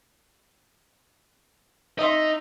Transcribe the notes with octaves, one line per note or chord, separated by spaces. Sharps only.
D#4 D#5 E5 C6